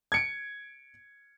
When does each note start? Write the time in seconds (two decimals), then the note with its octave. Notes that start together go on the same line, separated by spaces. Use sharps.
0.12 G#6 C#7 D7